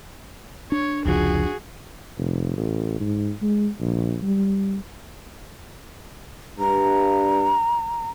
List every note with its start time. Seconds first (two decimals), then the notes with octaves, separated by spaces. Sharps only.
0.72 D4 C#5
1.06 F1 C#2 F3 F#4 G#4
2.18 F1
2.57 A1
3.00 G#2
3.42 G#3
3.80 A#1
4.22 G3
6.59 G2 A#5